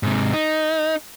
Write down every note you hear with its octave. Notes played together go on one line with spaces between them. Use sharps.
G#2 C3
D#4